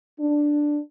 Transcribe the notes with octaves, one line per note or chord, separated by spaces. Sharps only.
D4